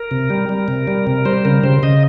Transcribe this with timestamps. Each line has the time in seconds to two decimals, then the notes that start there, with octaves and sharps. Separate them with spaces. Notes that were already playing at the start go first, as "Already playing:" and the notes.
Already playing: A#4
0.11 C3
0.30 G3
0.49 G3
0.68 C3
0.87 G3
1.07 C3
1.25 G3 C5
1.45 C#3 A#4
1.64 C#3 C5
1.83 C#3 D#5